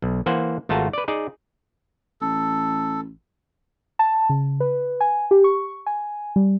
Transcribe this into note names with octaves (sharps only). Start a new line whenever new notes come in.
B1
E3 A#3 C5 F#5 G#5
G#1 A3 F4 F#4 A5 A#5
B4 D5
D#4 G#4 D5
A1 A4
A5
C#3
B4
G#5
G4
C#6
G#5
G3